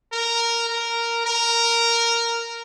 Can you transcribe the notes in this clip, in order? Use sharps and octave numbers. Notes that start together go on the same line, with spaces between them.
A#4
A#4
A#4